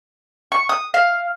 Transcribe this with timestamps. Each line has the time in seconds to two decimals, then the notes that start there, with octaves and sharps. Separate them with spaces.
0.52 C#6
0.69 D#6
0.94 F5